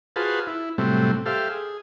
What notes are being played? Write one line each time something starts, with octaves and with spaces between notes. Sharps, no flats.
F4 F#4 G#4 B4 C5 A5
E4
A2 C3 F#3 G3 A3 C4
G4 A4 C5 E5 F5
G#4